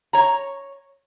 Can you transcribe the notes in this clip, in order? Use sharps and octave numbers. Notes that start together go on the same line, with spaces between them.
C#5 A#5